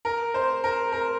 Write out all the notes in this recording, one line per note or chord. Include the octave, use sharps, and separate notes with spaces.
A#4
C5
A#4
A#4